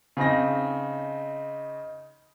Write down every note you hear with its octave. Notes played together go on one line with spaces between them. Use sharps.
C#3 C4 D#4 A#6